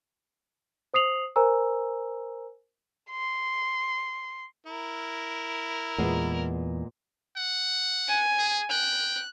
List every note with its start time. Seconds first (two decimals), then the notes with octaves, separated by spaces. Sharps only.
0.94 C5 D#6 C7 F7 F#7
1.36 A#4 C5 G#5 A#5 E6
3.11 C6
4.66 E4 A#4
5.98 E2 A#2 G#3 B3
7.37 F#5
8.09 G#5
8.39 G#4
8.71 G5 F#6